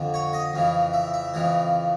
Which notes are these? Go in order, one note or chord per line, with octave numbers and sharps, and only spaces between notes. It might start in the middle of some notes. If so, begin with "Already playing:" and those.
Already playing: F2 D3
C#5
D#5
F2 C#3 E3
E5
E5
F2 C#3 E3